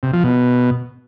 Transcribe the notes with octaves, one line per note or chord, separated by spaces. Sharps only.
C3
F3
B2